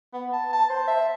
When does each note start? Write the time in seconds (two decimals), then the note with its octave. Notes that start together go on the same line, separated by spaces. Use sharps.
0.13 B3
0.33 A5
0.53 A5
0.69 C5
0.88 E5